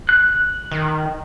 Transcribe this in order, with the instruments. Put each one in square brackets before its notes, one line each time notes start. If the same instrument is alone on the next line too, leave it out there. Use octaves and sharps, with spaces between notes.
[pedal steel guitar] F#6
[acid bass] D#3